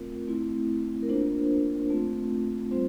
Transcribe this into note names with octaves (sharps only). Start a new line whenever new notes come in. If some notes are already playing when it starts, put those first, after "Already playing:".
Already playing: A3 C4 F4 A#4
A3 C4 E4
A#4
A#3 D4 F4 C5
A3 C4 F4
G3 C4 F4 C5